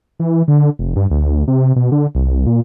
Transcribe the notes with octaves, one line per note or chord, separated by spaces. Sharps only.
E3
D3
F1
G2
D2
C3
B2
D3
C2
A#2